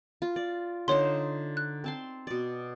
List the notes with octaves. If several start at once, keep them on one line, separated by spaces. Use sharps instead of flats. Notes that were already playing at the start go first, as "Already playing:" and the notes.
F4
D5
D3 D#4 C5 C#5 C6
F#6
C4 A5 C6
B2 D5